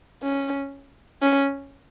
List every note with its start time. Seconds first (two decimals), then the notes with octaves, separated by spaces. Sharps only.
0.23 C#4
1.22 C#4